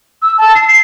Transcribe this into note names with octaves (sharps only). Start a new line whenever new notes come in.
E6
A5
C7
C7